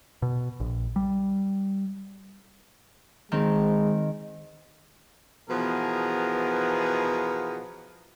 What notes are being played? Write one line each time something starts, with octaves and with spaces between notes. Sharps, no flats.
B2
A#1
G3
D#3 G#3 C4
B2 E3 F3 B3 G#4 A#4